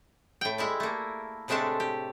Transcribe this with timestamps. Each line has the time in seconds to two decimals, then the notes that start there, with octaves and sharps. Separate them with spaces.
0.41 A2 G5
0.58 G3 G#3 E4
0.80 A3 A#3
1.48 A2 C3 G#3 A3 D4 A5
1.80 G4